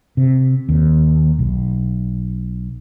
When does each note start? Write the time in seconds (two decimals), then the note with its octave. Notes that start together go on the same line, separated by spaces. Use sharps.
0.17 C3
0.69 D#2
1.39 B1